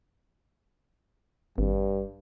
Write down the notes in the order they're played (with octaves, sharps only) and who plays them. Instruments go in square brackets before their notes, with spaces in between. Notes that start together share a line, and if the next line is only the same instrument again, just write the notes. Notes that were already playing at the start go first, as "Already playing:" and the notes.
[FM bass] G#1 [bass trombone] G2